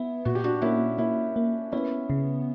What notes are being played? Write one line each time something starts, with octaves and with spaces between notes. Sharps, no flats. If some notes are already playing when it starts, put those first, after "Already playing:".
Already playing: B3 E4
A#2 F#4
G4
D4 F#4
A#3 C#4 E4
A#3 C#4 E4
A#3
B3 C#4 E4
C#3